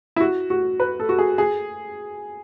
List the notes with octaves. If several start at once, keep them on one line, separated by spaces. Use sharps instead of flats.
E4
F#4
F#4
B4
A4
F#4
G#4
G#4